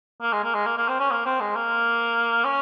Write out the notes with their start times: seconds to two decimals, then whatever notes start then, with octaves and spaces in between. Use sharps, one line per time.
0.22 A#3
0.33 G#3
0.44 A#3
0.55 G#3
0.66 A#3
0.77 A#3
0.89 C4
0.99 C#4
1.11 A#3
1.26 C4
1.40 G#3
1.55 A#3
2.45 C#4